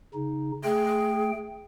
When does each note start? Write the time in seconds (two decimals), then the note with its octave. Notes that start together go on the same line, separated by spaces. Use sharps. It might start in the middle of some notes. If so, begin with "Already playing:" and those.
0.14 C#3 D#4
0.64 A3 G#4 G5